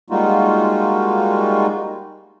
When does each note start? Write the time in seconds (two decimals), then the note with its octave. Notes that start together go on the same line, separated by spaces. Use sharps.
0.10 G3 G#3 A#3 D#4 F4 F#4